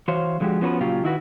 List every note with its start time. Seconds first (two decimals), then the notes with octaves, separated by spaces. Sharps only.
0.08 E3 F#4 C5 C#5 F5
0.40 D3 F3 G#3 F#4 G4
0.61 F3 B3 C#4 F4 F#4 B4
0.81 A#2 C#3 F#3 F4 G4
1.04 D#3 E4 F#4 B4